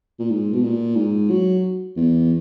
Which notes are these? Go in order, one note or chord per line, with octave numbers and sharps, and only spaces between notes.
A#2
G#2
B2
A#2
G#2
F#3
E2